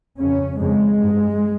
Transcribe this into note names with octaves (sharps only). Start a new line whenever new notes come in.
F2 C#3 C#4
F2 C#3 G#3
G2